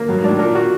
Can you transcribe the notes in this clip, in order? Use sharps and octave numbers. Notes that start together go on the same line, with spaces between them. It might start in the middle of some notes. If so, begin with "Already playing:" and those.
Already playing: A#3
G2 F#3
G#2
A2 D4
A#2 A#4
A#2 F#4